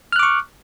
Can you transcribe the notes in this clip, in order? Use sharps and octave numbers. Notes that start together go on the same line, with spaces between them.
C#6 D6 F6 F#6